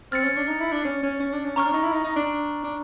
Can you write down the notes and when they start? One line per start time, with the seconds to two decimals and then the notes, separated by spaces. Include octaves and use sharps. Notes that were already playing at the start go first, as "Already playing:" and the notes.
0.12 C4 F6 A6 C#7
0.24 C#4
0.37 D4
0.48 D#4
0.60 E4
0.72 D4
0.85 C#4
1.03 C#4
1.20 C#4
1.33 D4
1.45 C#4
1.56 C#4 A#5 C#6 F6
1.66 D4
1.74 D#4
1.83 E4
1.92 D#4
2.04 D#4
2.16 D4
2.64 D4